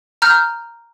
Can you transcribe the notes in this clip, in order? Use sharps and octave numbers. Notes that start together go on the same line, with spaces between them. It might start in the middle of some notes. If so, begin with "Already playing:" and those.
A#5 F6 G6